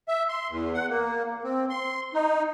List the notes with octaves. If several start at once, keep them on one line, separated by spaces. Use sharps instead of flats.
E5
C6
E2
F#5
A#3
C4
C6
D#4